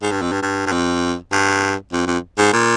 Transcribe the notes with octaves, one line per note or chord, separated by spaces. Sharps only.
G#2
G2
F2
G2
G2
G2
F2
G2
F2
F2
G#2
A#2